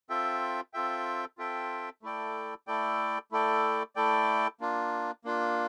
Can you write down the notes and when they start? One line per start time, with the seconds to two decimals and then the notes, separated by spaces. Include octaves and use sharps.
0.09 C4 F4 A4 E5 G5
0.73 C4 F4 A4 E5 G5
1.38 C4 F4 A4 E5 G5
2.02 A3 E4 A4 D5 G5
2.67 A3 E4 A4 D5 G5
3.32 A3 E4 A4 D5 G5
3.96 A3 E4 A4 D5 G5
4.60 A#3 D4 F4
5.24 A#3 D4 F4